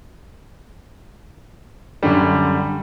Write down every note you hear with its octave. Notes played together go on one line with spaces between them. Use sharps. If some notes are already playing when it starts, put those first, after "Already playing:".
F#2 D3 G3